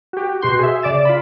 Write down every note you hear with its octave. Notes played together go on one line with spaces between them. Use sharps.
F#4 G4
B2 F#4 C6 G6
G#4 E5
C#3 D5 D6 A6 E7
F4 B5